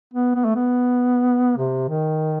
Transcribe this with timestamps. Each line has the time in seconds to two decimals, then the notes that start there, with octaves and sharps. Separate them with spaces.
0.13 B3
0.35 B3
0.45 A3
0.55 B3
1.57 C3
1.88 D#3